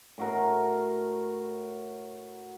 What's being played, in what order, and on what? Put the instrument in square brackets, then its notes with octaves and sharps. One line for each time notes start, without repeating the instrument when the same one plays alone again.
[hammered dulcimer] A2 F#4 A#4